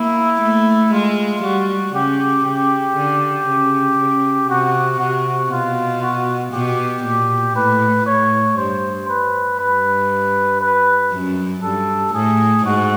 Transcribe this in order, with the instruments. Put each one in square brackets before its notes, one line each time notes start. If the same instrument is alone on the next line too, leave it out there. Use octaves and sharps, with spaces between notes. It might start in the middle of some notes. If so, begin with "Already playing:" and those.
Already playing: [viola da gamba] A#3 [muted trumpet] E4
[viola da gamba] A3
[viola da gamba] G#3 [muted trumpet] F4
[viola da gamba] G3 [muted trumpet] F#4
[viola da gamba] C#3 [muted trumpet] G4
[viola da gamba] C#3 [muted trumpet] G4
[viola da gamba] D3
C#3
C#3
[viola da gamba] C3 [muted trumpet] F#4
[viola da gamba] C3 [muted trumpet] F#4
[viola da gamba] B2 [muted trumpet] F4
[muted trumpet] F#4
[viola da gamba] B2 [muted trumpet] G4
[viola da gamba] A#2
[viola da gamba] A2 [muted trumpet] B4
[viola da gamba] A2 [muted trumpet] C#5
[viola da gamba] G2 [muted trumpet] C5
[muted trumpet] B4
[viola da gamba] G2 [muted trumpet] B4
[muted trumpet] B4
[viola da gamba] F#2
[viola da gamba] G2 [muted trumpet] A4
[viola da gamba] A2 [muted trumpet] G#4
[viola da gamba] G#2 [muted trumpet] F#4